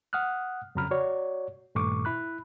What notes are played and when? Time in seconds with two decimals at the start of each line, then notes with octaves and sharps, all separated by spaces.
0.13 F#5 D#6 F6 F#6
0.75 F2 C#3 F#3 A#5 B5 F6
0.91 F#4 C#5 D5
1.75 G2 A#2 D#3 A3 C#6 D6
2.05 E4 B5 F#6